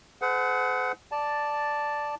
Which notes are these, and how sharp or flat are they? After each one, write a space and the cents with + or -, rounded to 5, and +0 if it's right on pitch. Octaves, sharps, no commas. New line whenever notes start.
G#4 +40 C5 -45 F#5 +0
D5 +0 A5 +0